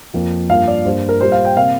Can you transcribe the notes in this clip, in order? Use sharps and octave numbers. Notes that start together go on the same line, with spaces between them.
F2 F3 A#3
G2 F3 A#3 F5
D5
G2 G3 A#3 C5
A#4
A#2 G3 A#3 C5
F5
G5
C3 A#3 F5